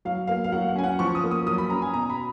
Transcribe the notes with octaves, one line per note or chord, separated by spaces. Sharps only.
F#3 F5
A#3 F5
F5
F#3 F#5
F#5
C#4 G#5
F#5
F3 C#6
D#6
A#3
D#6
F#3 D#6
B5
C#4 A#5
G#5
B2 A#5
B5